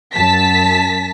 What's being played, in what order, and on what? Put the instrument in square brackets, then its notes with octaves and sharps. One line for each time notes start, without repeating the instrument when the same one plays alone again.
[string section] F#2 A5 B6